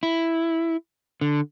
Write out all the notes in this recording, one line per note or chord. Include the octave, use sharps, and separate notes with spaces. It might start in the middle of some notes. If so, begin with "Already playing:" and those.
E4
D3